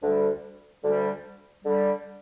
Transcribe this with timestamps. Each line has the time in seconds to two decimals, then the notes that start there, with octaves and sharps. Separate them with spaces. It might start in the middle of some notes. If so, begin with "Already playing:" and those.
0.01 D2 D3 G3
0.83 D2 D3 G3
1.64 D3 G3